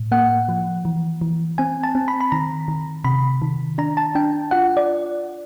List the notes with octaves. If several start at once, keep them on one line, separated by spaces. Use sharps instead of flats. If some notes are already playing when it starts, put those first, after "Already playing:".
Already playing: A2
A#3 F#5
F3
E3
E3
C4 G#5
A5
C4
B5
B5
D#3 A#5
D#3
C3 B5
D#3
D4 A#5
A5
D4 G5
F4 F#5
D5